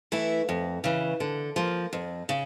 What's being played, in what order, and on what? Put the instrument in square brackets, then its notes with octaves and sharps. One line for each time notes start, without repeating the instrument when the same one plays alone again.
[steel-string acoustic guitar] E3 A3 E4
F2
C#3 E3
D3
F3 A#3
F2
C#3